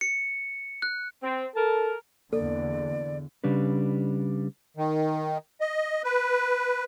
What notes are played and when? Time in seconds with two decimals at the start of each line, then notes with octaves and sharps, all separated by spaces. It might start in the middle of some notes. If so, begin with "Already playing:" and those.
0.01 C#7
0.82 F#6
1.23 C4
1.55 A4 A#4 A5
2.33 E2 D3 A#3 A4 D5
3.44 C#3 G3 D4 B4
4.77 D#3
5.61 D#5
6.04 B4